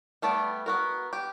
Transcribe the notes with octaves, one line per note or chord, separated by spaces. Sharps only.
G3 A3 B3 D5
B3 F#4 A#4
G4